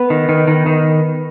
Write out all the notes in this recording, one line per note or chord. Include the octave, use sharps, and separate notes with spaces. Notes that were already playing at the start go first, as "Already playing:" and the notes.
Already playing: B3 B4
D#3
D#3
D#3
D#3